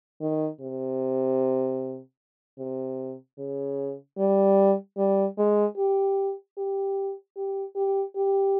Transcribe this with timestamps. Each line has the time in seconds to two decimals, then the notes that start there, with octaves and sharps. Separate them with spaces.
0.21 D#3
0.61 C3
2.59 C3
3.38 C#3
4.18 G3
4.98 G3
5.38 G#3
5.78 G4
6.58 G4
7.37 G4
7.76 G4
8.16 G4